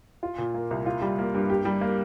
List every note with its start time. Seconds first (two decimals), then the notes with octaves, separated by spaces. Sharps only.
0.23 F4
0.38 A#2
0.54 A#3
0.71 C2
0.86 F4
1.02 G3
1.19 A#3
1.34 G2
1.50 G4
1.65 G3
1.81 A#3